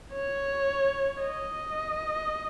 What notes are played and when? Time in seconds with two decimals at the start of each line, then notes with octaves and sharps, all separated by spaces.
0.13 C#5
1.22 D#5